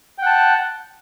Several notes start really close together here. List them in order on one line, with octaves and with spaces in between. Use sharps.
G5 F#5 A5